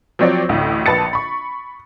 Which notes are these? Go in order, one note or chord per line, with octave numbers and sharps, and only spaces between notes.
F3 F#3 C4 C#5 D5
A1 D2 A2
A#1 B4 A5 A6 C#7
B5 C#6